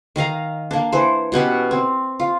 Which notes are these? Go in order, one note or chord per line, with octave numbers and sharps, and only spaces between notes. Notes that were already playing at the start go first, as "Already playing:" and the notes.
D#3 D#5 F5 A#5
A#3 D4
E3 C5
B2 B3 C#4 G4
C4
F4